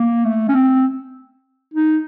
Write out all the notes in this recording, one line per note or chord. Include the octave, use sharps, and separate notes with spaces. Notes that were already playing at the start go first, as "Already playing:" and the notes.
Already playing: A#3
A3
C#4
C4
D#4